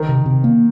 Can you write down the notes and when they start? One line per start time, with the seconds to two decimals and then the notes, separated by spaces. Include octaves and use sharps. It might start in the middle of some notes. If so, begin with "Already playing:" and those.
Already playing: D#3
0.09 C3
0.26 C3
0.44 A#3